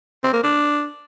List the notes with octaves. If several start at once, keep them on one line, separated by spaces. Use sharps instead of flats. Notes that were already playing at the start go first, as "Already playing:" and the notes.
C4
A#3
D4